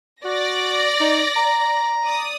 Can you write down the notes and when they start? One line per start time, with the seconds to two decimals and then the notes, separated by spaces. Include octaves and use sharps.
0.24 F#4 D5 A#6
1.00 D#4
1.36 A#5
2.04 D5 D#6